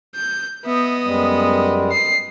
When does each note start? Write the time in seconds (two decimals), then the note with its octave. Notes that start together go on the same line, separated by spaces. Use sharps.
0.15 G6
0.65 B3 D#5 E5
1.05 F#2 G3 G#3
1.92 C7